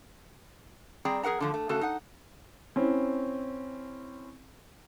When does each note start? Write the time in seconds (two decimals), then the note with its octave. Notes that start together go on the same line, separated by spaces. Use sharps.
1.05 G3 C4 G#4 D5 G5 A#5
1.23 F2 G#4 A#4 F#5 A#5
1.40 D3 F3 A3
1.54 A3
1.69 C#3 A3 F#4 A4
1.81 D#4 F#5
2.76 C4 C#4 E4